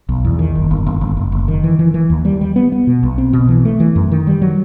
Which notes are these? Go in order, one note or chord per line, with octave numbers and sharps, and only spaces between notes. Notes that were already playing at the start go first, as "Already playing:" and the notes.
B1
E2
D#3
F#1
G1
G1
G1
F#1
F#1
D#3
E3
E3
E3
D#2
G3
G3
B3
B3
B2
B1
C4
B2
E3
A3
E3
F#2
D#3
G3
F#3